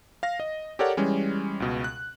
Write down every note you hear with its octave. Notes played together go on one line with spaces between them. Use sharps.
F5 A#6
D#5
G4 A4 A#4 C#5 D5 F#5
E3 G3 G#3 C#4
C#2 B2
F#6